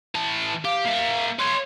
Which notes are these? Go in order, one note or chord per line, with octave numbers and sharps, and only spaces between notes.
E3 A5
G4 F5
A#3 E5
B4 C#5 C6